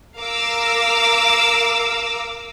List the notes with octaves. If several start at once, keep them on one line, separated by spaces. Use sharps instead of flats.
A#4 F5 A#5 D6 E6